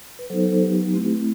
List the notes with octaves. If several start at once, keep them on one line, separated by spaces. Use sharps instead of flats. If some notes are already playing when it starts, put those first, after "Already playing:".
B4
F#3 B3 D#4 A4 C5
A4 C5
G4 B4
A3 C4 E4 G4 B4